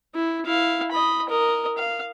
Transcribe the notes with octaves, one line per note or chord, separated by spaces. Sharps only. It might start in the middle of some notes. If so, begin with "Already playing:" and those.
E4
E4 F5
D#5 B5
A#4 D#5
F5